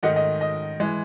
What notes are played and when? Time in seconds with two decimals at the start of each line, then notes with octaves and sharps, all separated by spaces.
0.03 G#2 D#3 A3 D#5 F#5
0.16 D#5
0.41 D#5
0.80 E3 G#3